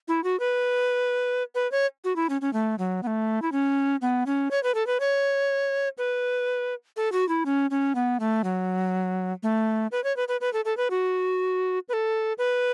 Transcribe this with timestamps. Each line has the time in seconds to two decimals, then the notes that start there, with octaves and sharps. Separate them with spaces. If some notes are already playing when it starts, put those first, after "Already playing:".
0.08 E4
0.24 F#4
0.40 B4
1.55 B4
1.72 C#5
2.04 F#4
2.16 E4
2.29 C#4
2.41 C#4
2.53 A3
2.79 F#3
3.03 B3
3.07 A3
3.42 E4
3.52 C#4
4.02 B3
4.26 C#4
4.51 C#5
4.63 B4
4.75 A4
4.87 B4
5.00 C#5
5.98 B4
6.97 A4
7.12 F#4
7.29 E4
7.46 C#4
7.71 C#4
7.95 B3
8.20 A3
8.44 F#3
9.43 A3
9.92 B4
10.04 C#5
10.17 B4
10.28 B4
10.41 B4
10.53 A4
10.65 A4
10.77 B4
10.90 F#4
11.89 B4
11.93 A4
12.38 B4